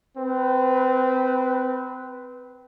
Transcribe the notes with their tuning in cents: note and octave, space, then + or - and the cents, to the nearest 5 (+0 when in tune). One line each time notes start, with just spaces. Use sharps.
C4 -25 B4 +0